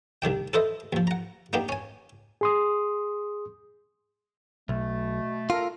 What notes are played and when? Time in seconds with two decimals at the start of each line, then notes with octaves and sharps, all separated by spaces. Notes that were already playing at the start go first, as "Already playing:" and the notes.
0.22 C2 D#3 D4 G5
0.53 A4 B4 C5 D#5 E5
0.93 D#2 F3
1.07 F#5 A#5
1.53 A#3 B3 D4 D#4 G4
1.69 C#4 G#5
2.41 G#4 C6 D#6
4.69 B1 B2 A3
5.50 F4 A4 A#4